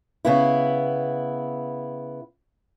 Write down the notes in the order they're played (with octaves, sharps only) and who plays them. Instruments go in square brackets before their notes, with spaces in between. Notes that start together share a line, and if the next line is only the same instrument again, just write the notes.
[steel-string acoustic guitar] C#3 B3 E4